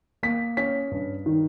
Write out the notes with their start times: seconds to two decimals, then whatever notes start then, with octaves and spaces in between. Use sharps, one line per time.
0.23 A#3 B6
0.57 C#4 B6
0.91 G2
1.26 D#3